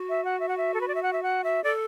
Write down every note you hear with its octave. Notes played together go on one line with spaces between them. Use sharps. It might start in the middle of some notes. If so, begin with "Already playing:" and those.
Already playing: F#4
E5
F#5
E5
F#5
E5
A4
B4
D5
E5
F#5
E5
F#5
E5
A4 D5